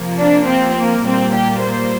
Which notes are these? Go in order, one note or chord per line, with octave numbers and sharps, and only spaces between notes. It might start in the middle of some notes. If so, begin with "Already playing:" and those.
Already playing: C3 F3 A#3
D4
C4
A#3
A#2 G3 A#3 C4
G4
C5